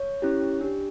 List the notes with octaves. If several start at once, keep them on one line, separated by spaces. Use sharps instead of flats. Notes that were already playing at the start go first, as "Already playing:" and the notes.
Already playing: C#5
C#4 E4 G4
D4 G4